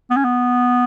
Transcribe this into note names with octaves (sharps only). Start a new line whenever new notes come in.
B3
C#4
B3